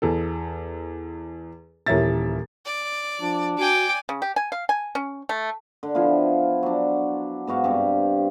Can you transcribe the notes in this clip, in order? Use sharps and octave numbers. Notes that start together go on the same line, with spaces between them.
E2 A4
D#1 E3 A#4 C#5 E5 A6
D5
F3 D4
F#4 D5 G5 G#5 D6
C#3
G4
G#5
F5
G#5
C#4
A3
D3
F3 B3 E4 F4
F#3 D4
G#2 B3 F#4 F5
G2 C3 G4